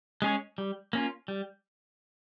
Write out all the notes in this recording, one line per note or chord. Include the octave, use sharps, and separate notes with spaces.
G#3 C#4 G#4 C#5
G3
A#3 C#4 F4
G3